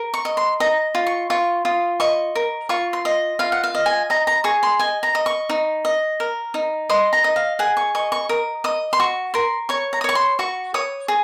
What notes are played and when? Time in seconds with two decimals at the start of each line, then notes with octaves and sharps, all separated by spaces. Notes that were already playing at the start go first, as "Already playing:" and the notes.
Already playing: A#4
0.14 C#6
0.25 D#5
0.37 C6
0.60 D#5 A#5
0.95 F4
1.07 C#6
1.30 F4 C#6
1.65 F4 D#6
2.00 D#5 C#6
2.35 A#4
2.69 F4 C#6
2.93 C6
3.05 D#5
3.39 F4 F5
3.52 F#5
3.64 F5
3.75 D#5
3.86 G#5
4.10 D#5 A#5
4.27 A#5
4.44 G#4 C#6
4.63 C6
4.79 D#5 G#5
5.03 A#5
5.15 D#5
5.26 C#6
5.49 D#4
5.85 D#5
6.20 A#4
6.54 D#4
6.90 D#5 C6
7.13 A#5
7.24 D#5
7.36 F5
7.59 G#4 F#5
7.77 C#6
7.95 D#5 C#6
8.12 C#6
8.29 A#4 D#6
8.64 D#5 D#6
8.93 C6
9.00 F#4 C#6
9.34 A#4 C6
9.69 C#5 C#6
9.93 A#5
10.01 D#6
10.04 C#5 C#6
10.15 C6
10.39 F#4 C#6
10.74 C#5 D#6
11.08 G#4